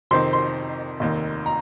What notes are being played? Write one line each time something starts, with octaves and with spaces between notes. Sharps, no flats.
F2 C3 D#3 C4 C6
C6
F1 D#2 D#3
A#5